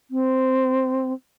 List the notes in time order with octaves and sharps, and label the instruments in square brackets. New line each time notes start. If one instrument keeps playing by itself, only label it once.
[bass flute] C4